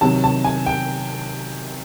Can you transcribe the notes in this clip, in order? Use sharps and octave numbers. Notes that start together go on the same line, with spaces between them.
C3 D#3 F#3 A5
A5
G#5
G5